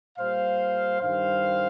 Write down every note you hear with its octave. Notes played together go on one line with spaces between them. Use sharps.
A#2 G3 C5 F5
G2 D#3 G3 C5 F5